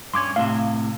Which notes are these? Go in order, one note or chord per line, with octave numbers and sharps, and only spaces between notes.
G2 C#4 C6 D6 G#6
A2 C3 F5